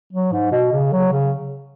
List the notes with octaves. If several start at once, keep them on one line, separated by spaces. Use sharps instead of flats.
F#3
G#2
B2
C#3
F#3
C#3